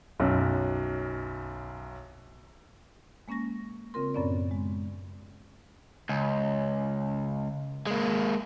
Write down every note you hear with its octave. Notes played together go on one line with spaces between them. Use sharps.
B1 F#2
G#3 A#3 C#4 C#6 A#6
C#3 C4 F4 A#4 C6
F#2 A2 B3 C#4 C#5 D5
G#3
C#2
G#3 A#3